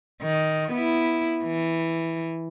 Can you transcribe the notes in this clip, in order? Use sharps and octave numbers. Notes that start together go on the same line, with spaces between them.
D#3
B3 E4
E3